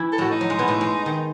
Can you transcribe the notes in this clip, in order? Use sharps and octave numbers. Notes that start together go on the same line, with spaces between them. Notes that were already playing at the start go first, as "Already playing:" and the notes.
Already playing: E3 E4
A4
A2 A3 F#4
D#4
F#3
G#3
B2 B3
A2 A3
G#3
D#3